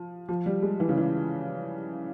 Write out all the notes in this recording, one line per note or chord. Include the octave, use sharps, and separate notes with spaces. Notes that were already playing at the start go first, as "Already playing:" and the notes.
Already playing: F3
F3
G3
G#3
E3
C#3
E3